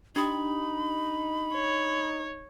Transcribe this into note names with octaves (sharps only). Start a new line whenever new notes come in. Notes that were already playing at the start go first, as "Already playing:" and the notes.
D4 D#4 G4 B5 D#6
C#5